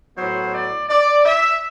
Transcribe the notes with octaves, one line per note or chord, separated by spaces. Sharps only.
A2 F#3 B3 C5
D5
D5
E5